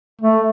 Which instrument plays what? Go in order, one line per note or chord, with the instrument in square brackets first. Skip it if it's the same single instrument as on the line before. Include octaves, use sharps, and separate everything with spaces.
[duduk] A3